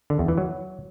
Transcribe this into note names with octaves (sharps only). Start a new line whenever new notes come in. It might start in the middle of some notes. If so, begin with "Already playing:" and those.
D3
E2
E3
F#3